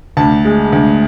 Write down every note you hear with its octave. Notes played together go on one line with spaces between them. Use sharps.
D2 A5
G#3
D2